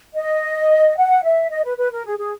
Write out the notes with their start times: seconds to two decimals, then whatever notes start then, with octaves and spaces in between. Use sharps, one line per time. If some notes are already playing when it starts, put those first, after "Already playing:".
0.15 D#5
0.97 F#5
1.24 E5
1.50 D#5
1.64 B4
1.77 B4
1.92 A#4
2.06 G#4
2.18 G#4